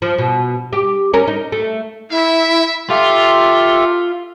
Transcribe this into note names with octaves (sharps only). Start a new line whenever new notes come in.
F3
B2
G4
C#4 A#4
D#4
A3
E4 E5
F4 G4 A4 E5